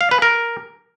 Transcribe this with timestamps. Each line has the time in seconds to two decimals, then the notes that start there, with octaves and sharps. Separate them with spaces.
0.01 F5
0.11 B4
0.22 A#4